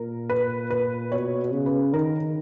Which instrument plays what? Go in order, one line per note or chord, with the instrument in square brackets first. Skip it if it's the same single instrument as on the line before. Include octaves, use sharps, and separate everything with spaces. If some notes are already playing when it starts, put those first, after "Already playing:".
Already playing: [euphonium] A#2 [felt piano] A#4
[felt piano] B4
B4
[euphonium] B2 [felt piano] C#5
[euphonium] C#3
[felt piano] B4
[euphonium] D#3 [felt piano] A#4